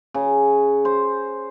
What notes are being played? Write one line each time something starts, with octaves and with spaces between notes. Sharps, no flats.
C#3
C5